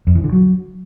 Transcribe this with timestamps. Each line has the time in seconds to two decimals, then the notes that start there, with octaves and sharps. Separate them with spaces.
0.07 F2
0.15 E3
0.24 D3
0.32 F#3